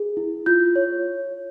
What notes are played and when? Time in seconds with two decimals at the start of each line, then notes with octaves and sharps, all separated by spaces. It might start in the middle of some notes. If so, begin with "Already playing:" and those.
Already playing: G#4
0.17 E4
0.46 F4 G6
0.76 C#5